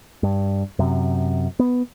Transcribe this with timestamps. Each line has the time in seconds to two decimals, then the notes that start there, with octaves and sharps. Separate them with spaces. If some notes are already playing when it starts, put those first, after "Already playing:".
0.23 G2
0.79 F#2 C3
1.59 B3